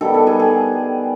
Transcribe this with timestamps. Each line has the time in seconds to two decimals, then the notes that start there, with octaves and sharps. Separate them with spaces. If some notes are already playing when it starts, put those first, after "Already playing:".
0.01 D#3 G3 B3 A4
0.14 A4
0.27 G#4
0.40 G#4